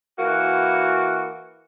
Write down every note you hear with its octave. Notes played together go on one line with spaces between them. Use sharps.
E3 A#3 F#4